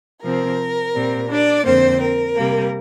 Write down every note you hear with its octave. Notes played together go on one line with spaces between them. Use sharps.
C3 F3 C4 A#4
A#2 G3 C4
D4 D5
F2 D3 A#3 C4 C5
A#4
C3 G3 A#3